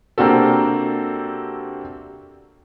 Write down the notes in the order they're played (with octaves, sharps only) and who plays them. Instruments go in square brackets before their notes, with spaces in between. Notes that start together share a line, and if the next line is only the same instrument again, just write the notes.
[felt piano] C3 A#3 C4 D4 F#4 A4